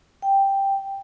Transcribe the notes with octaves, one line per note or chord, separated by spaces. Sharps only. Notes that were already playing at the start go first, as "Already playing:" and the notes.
G5